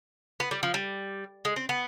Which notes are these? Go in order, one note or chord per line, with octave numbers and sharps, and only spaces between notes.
B3
G3
F3
G3
G#3
C4
B3